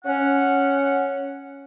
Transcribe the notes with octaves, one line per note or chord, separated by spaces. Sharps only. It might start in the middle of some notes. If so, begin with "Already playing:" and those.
C#4 F#5